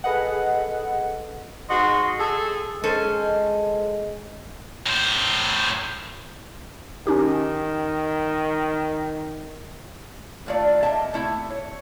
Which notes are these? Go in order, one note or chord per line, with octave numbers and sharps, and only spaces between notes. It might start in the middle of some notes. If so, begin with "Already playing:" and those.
G#4 A4 B4 D#5 F#5
G#2 F#4 D#5 C6
G#4 A4
G#3 C#4 A4 C5
A2 C5
D#3 C#4 D#4 G4
A#2 D#3 A3 F4 D5
A#2 D#5 E5 A5
C3 A3 E4 E5
C#5